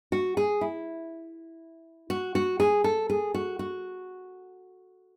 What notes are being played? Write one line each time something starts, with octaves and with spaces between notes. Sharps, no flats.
F#4
G#4
E4
F#4
F#4
G#4
A4
G#4
F#4
F#4